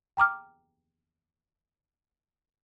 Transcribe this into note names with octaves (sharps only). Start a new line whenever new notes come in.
G5 A#5 D6 F6